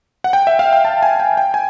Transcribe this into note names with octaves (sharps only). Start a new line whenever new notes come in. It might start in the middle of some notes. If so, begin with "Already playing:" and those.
F#5
G5
E5
F5
G5
A5
G#5
G5
G5
G#5